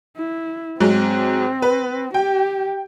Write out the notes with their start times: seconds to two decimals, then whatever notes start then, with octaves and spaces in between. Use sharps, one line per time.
0.18 E4
0.80 G#2 F#3 G#3 C4
1.62 B4
2.14 G4 G5